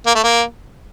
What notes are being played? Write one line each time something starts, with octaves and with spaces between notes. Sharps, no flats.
A#3
A3
A#3